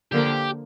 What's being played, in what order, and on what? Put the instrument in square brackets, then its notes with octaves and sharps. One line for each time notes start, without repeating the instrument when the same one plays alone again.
[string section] D3 F3 A#3 [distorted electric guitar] G4